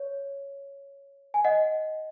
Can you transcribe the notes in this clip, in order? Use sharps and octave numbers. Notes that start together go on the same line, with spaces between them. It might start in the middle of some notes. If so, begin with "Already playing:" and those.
Already playing: C#5
G#5
D#5 F#5